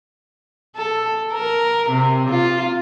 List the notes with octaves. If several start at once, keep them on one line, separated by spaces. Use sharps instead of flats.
A4
A#4
C3
F4